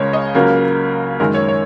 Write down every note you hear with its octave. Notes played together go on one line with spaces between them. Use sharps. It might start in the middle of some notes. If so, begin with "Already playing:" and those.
Already playing: C#2 C#3 G#3 A#4 C#5
D#5
C#2 C#3 F#3 A#3 A#4
F#2 D#3 G#3 A#4
C#5
C#5